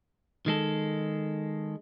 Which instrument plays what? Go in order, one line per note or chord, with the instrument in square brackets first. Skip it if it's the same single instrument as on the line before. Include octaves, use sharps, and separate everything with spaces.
[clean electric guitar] D#3 G#3 A4